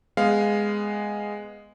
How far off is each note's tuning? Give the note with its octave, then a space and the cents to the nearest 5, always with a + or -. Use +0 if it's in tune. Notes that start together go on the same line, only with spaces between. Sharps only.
G#3 -5 B3 +0 F5 +0